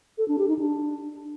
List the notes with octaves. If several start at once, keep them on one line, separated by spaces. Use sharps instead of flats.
A4
D4
G4
D#4
D4